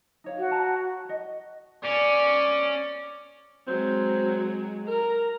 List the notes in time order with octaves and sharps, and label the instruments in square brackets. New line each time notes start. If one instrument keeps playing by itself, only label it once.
[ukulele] D#4 C#5 F5
[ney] F#4
[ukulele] A5 A#5
G4 D#5
[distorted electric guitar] C#4 [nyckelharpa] D5
[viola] F#3 G#3 [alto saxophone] C4
[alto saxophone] A#4 [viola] A#5